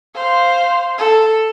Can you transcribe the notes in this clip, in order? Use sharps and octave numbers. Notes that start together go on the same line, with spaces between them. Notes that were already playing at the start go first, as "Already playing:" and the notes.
C5 F5
A4